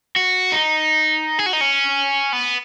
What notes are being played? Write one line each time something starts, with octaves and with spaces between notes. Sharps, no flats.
F#4
D#4
G#4
F#4
D#4
C#4
B3